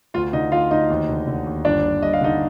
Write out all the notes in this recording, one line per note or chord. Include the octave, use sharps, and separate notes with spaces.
D2 F4 F5
D3 D#4 D#5
D3 F4 F5
D2 D#4 D#5
D#2
D3
D3
D#2
G1 D4 D5
G1
G2 D#5
F5
D3 D#4 D#5